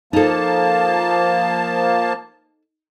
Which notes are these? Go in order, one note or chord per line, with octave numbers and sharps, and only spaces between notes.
F3 A#3 D#4 A4 A5